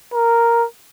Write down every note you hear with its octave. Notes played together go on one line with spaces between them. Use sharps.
A#4